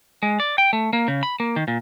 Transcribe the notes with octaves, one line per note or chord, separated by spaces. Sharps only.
G#3
D5
G5
A3
A#3
C#3
B5
A#3
D#3
A#2